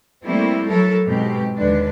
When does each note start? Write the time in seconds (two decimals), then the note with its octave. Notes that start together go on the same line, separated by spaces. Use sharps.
0.24 G3 A3 A#3 C4 E4
0.68 F#3 E4 A4 A#4
1.05 G#2 B2 C4 G4
1.55 D#2 D3 G#3 D4 B4